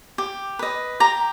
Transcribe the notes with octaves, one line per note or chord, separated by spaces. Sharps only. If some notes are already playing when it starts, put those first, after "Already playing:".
G4
B4 D#5
G4 A#5